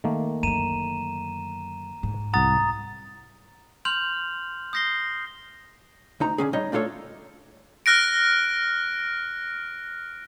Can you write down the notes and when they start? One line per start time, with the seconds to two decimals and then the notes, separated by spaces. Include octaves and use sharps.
0.04 D#3 A3 A#3
0.43 F#2 D3 A#5 D#7 E7
2.03 G#2
2.34 C2 F#5 A#5 D#6 A6
3.85 C6 F6 G6 F7 F#7
4.73 D#6 G6 A#6 C7 G7
6.20 D2 D#4 A#5
6.38 D3 C#4 G#4
6.53 G3 D#4 C#5 D#5
6.72 A3 D4 F4 A4 C#5
7.86 F6 F#6 A#6 D7